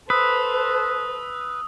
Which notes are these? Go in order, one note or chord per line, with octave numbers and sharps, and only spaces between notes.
A4 B4 C5 D#6 E6